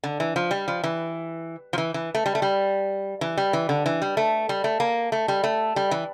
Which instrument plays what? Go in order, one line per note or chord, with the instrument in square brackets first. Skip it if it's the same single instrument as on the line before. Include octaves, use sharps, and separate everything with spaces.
[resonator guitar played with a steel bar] D3
E3
F3
G3
F3
E3
F3
E3
E3
A3
G3
A3
G3
E3
G3
E3
D3
E3
G3
A3
G3
A3
A#3
A3
G3
A3
G3
E3